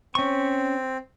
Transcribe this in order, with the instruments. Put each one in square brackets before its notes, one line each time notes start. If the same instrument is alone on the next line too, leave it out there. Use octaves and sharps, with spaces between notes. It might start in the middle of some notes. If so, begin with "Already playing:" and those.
[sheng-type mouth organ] C4 [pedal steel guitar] C#4 C#6